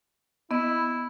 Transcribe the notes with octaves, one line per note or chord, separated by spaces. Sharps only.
B3 E4 D#5